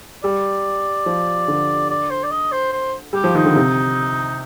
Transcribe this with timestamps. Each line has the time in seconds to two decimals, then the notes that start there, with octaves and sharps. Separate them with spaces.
0.23 G3 D5
1.06 F3
1.48 D3
1.90 D5
2.10 C5
2.24 D5
2.31 D#5
2.52 C5
2.73 C5
3.13 G3 G4
3.24 F3
3.35 D#3 D#4
3.45 D3
3.55 C3